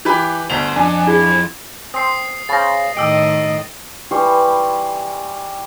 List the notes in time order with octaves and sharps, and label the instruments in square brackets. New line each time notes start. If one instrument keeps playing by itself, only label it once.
[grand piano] E3 G4 B4
[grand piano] G1 D2 F7 [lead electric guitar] C5
[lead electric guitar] F2 [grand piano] D4 [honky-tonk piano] G#5
[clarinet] E4 [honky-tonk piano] G#4
[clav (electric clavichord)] C4 [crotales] D#6 C7
[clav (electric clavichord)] C#3 C5 [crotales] A6 A#6
[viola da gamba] A2 D#3 D#5 [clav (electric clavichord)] G4 [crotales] E6 D7
[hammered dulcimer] E3 G3 C6 C#6